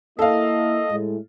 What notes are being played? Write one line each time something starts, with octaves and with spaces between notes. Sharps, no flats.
A#3 E4 A4 D#5 F5
A2 G#3